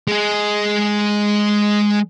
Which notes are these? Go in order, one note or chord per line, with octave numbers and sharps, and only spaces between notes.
G#3 G#4